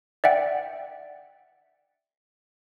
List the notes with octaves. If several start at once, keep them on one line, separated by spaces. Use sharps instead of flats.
D5 E5 F#5 G5